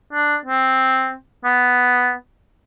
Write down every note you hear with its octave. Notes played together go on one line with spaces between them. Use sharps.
D4
C4
B3